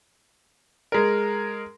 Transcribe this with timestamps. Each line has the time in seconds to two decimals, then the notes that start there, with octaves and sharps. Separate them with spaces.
0.92 G#3 A#4